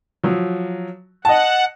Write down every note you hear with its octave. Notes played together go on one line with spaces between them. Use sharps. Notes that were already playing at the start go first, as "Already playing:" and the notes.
F3 F#3
D#5 F#5 A5